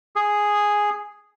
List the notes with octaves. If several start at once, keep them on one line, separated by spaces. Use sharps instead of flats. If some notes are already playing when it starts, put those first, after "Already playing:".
G#4